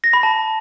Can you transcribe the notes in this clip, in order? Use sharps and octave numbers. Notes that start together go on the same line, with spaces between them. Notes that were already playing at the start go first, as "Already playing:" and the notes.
A#6
B5
A5